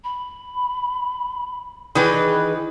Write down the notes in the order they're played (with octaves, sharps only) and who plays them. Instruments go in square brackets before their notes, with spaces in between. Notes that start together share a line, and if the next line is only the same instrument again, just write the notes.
[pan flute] B5
[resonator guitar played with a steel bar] D#3 E3 B4 [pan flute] G#4